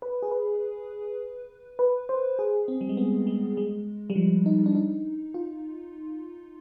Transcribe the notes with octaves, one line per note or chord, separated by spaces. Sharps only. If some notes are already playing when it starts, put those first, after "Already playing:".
B4
G#4
B4
B4
C5
G#4
C4
G3
G#3
B3
G#3
G#3
G3
F3
D#4
D4
D#4
F4